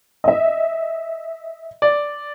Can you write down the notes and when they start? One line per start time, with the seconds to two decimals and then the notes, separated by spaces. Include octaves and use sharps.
0.24 D#5 E5
1.82 D5